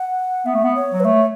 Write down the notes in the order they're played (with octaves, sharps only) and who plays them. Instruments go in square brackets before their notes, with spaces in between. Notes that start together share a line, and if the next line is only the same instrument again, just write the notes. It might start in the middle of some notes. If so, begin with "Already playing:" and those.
Already playing: [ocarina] F#5
[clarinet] B3 [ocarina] E5
[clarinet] A3
B3
[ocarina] C#5
[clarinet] F#3
[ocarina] B4
[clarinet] A3 [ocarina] C#5